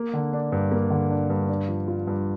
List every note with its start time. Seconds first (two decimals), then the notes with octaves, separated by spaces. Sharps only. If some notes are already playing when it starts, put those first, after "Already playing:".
Already playing: A#3
0.13 D3
0.33 D4
0.52 G2
0.71 A#3
0.90 D3
1.10 D4
1.30 G2
1.49 D4
1.68 F3
1.88 F4
2.07 G2